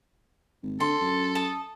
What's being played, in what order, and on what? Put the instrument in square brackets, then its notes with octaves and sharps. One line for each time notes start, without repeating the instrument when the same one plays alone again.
[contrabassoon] G#1
[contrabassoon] D3 [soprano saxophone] A4 [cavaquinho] C6
[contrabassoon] F#2
[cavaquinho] A5 D#6